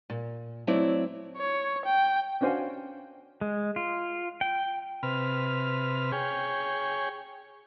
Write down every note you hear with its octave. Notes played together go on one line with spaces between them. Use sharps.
A#2
F#3 A3 C4 E4 C#5 D5
C#5
G5
C#4 D4 F#4 C5 F5 G#5
G#3
F4
G5
C3 B4 F6
G#4 C#5 G5